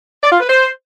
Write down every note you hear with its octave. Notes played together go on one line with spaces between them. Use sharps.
D5
F4
B4
C5